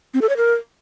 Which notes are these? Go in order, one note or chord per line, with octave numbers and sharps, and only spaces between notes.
C4
A4
C#5
A#4